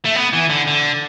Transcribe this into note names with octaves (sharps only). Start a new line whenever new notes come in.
A3
B3
E3
D3
D3